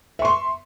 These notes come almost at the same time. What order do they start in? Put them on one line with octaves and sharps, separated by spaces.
E5 C#6 C6